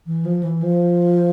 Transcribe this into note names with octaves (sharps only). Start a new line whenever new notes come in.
E3
F3
E3
F3